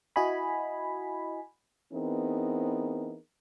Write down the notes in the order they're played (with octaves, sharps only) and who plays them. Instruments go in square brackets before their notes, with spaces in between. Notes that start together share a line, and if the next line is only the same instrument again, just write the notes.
[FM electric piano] E4 F#4 D#5 G#5 B5
[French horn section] E3 B3 C4 D#4 G#4 A#4